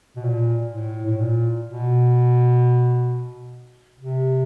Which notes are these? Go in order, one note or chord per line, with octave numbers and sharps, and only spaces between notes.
B2
A#2
A2
A2
A#2
B2
C3